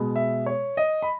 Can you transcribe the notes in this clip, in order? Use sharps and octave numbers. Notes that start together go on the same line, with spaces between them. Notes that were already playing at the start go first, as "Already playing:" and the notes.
Already playing: B2 G#3
E5
C#5
D#5
B5